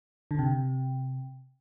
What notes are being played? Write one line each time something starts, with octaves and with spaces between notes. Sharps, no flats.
D3
C3